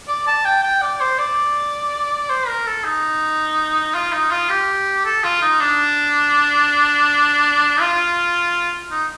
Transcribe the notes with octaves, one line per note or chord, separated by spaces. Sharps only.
D5
A5
G5
G5
D5
C5
D5
C5
A#4
A4
D#4
F4
D#4
F4
G4
A4
F4
D#4
D4
F4
D#4